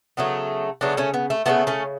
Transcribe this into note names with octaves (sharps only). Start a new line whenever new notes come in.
C#3 F#3 A3 B3
C#3 F#3 A3 B3 D4
A3 C#4
B3
A3
C#3 F#3 A3 B3
A3 C#4